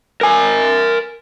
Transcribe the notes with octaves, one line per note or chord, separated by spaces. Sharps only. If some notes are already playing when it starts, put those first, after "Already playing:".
A#4 G#5